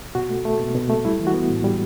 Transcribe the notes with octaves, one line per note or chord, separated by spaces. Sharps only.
B2 F#4
A3
A3
B2
B2
A3
G3 E4
E3
F#4
B3
A2
G3